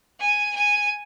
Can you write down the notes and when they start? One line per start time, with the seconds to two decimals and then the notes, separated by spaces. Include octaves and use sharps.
0.20 G#5
0.55 G#5